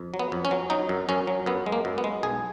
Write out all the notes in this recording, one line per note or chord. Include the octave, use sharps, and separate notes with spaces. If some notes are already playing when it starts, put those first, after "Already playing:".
Already playing: F2
F#3
B3
F2
C#4
F#3
F#3 D#4
F#2
F#2 C#4
F#3
F#2 B3
G#3
A#3
F#2
B3
G#3
B1 G#4